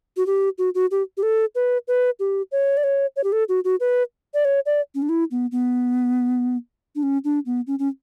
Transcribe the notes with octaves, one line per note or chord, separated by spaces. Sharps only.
F#4
G4
F#4
F#4
G4
G4
A4
B4
B4
G4
C#5
D5
C#5
C#5
G4
A4
F#4
F#4
B4
D5
C#5
D5
C#4
D4
E4
B3
B3
D4
C#4
D4
B3
C#4
C#4